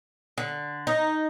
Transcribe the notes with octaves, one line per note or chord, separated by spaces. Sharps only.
D3
D#4